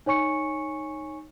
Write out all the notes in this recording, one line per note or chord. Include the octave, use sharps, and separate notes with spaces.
D#4 C#5 G#5 C#6 C#7